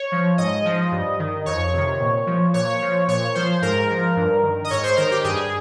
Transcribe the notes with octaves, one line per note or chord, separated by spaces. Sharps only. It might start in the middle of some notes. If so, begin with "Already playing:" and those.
Already playing: C#5
F3
G#2 D#5
F3
G2
D#3
F2 C#5
C3 D#3
A#2
F3
A#2 C#5
F3
A#2 C#5
F3 C5
G#2 A#4
F3
G2
D#3
D#5
G#2 C#5
C5
D#3 A#4
G4
G2 G#4